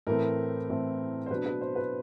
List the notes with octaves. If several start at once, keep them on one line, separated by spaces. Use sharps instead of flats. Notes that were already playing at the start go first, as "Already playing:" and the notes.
A2 E3 A3 C4 A#4
A2 E3 A3 C4
C5
B2 F#3 B3 D4 B4
B4
C5
B4